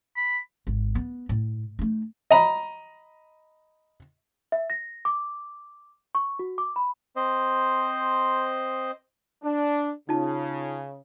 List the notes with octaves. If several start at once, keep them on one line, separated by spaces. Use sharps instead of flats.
B5
G#1
B3
A2
A3 D#4
D#5 A#5 B5
E5
A#6
D6
C#6
F#4
D6
B5
C4 C5 D#5
D4
C#3 D#4 F4 A5